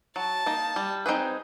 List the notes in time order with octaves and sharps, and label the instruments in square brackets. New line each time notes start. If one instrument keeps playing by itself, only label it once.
[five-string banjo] F#3 [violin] A5
[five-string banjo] A#3 D#4
G3
C4 D#4 G#4 B4